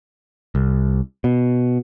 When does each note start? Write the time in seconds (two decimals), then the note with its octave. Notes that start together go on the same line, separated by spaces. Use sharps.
0.55 C2
1.24 B2